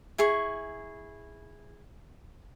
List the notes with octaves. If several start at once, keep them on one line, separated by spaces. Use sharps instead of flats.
E4 G#4 C#6